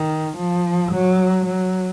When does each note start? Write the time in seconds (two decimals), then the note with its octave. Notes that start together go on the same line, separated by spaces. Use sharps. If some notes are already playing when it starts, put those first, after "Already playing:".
Already playing: D#3
0.37 F3
0.92 F#3
1.46 F#3